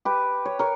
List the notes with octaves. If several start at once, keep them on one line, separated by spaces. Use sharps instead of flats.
G4 B4
C#5
A#4 C#5